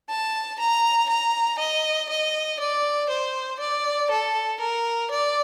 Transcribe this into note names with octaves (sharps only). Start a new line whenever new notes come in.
A5
A#5
A#5
D#5
D#5
D5
C5
D5
A4
A#4
D5